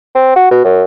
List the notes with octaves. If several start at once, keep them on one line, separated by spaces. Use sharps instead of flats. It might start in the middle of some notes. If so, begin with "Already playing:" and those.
C4
F#4
B2
F#2